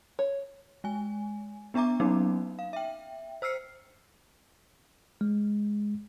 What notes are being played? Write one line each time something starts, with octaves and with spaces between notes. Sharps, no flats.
C#5
G#3 G#5
B3 D4 E5 A#5 D6
F#3 A#3 B3 C#4 D#4
F5
E5 G5
C5 E6 F6 C7 C#7
G#3